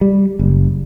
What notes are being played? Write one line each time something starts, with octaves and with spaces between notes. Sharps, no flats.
G3
F#1